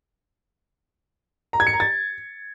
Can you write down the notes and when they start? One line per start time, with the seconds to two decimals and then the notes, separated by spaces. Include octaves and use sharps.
1.53 A#5
1.60 G#6
1.67 C#7
1.73 A#5
1.80 A6